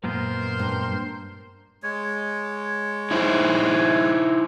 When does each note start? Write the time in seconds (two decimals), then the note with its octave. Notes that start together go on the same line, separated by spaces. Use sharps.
0.04 F#2 A#2 B3 A#4 C5
0.59 G2
1.83 G#3 C#5
3.11 D#4 E4 C5